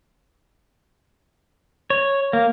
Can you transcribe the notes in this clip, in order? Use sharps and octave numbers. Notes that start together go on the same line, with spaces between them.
C#5
A#3